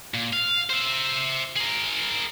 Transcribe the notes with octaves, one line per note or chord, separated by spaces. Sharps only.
A#2
F5
C5 E5
G#4 A#4